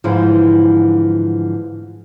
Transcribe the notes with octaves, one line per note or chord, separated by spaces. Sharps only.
G#2 D3 E3 F3